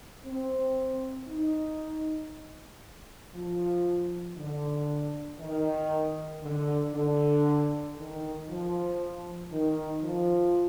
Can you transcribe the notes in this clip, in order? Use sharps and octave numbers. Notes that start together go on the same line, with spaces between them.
C4
D#4
F3
D3
D#3
D3
D3
D#3
F3
D#3
F3